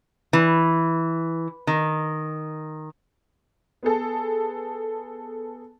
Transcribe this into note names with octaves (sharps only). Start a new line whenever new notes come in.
E3
D#3
B3 G#4 A4